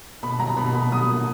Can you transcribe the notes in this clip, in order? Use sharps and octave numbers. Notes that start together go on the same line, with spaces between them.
B2 B5
F#3 A#5
B2 B5
B2 B5
F#3 D#6
A#3